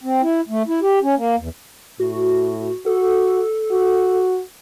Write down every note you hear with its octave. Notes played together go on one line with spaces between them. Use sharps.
C4
E4
A3
E4
G4
C#4
A#3
E2
A2 F#4
F#4 A4
F#4